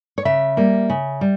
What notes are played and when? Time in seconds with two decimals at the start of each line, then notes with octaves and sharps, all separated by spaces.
0.18 C#5
0.25 C#3 E5
0.57 G3 A#3
0.90 C#3
1.21 G3